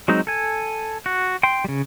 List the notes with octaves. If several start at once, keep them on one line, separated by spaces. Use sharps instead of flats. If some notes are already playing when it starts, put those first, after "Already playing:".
F#3 G#3 C4 D#4
A4 G#5
F#4
G5 C6
C#3 G3